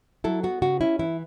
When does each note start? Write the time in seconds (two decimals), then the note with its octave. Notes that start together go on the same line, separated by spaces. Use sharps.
0.24 F#3 E4 A4
0.43 B3 F#4
0.62 C#3 F#4
0.81 C#4 E4
0.99 E3 E4